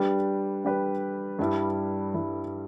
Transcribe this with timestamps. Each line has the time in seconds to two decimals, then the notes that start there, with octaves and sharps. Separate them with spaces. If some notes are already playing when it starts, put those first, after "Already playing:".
Already playing: G3 D4 G4 B4
0.64 G3 D4 G4 B4
1.39 G2 G3 E4
2.14 G2 G3 E4